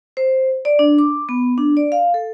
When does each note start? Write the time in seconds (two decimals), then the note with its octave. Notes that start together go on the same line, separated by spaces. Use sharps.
0.17 C5
0.65 D5
0.79 D4
0.99 D6
1.29 B3
1.58 D4
1.77 D5
1.92 F5
2.14 A4